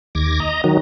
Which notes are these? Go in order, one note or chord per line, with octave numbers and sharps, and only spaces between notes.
D#2 D6 G#6 A#6
D#5 A#5
D#3 F#3